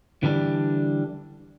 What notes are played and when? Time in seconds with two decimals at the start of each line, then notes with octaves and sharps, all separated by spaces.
0.23 D3 E3 G3 D4